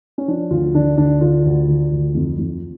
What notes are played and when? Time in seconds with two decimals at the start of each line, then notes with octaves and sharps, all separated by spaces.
0.18 C#4
0.28 F3 D4
0.50 D2 F4
0.74 D3 D4
0.97 D2 D4
1.21 D3 F4
1.45 D2
1.68 D3
1.91 D2
2.15 F2
2.38 F2